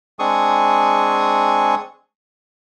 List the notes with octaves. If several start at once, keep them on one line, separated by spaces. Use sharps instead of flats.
G#3 C4 D4 G#4 C#6 D#6